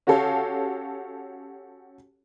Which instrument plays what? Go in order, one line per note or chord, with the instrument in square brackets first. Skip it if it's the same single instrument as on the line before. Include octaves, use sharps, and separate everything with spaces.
[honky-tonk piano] C#4 F#4 G4 A4 C#5 F5